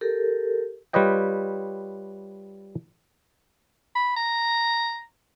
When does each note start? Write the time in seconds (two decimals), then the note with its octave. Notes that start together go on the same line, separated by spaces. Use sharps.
0.01 G4 A4 A#4
0.93 G3 F4 B4 C#5 D#5 G5
3.95 B5
4.16 A#5